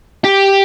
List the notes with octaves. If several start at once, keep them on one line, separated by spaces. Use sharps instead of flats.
G4